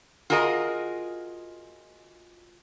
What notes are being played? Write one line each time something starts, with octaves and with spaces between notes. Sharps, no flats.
F4 F#4 G#4 A#4 D5 D#5